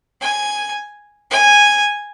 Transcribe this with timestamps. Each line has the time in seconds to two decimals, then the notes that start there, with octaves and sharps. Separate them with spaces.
0.21 G#5
1.30 G#5